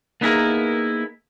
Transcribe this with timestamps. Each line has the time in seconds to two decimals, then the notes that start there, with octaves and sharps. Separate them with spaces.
0.21 A#3 B3 D#4 E4 G#4 A#4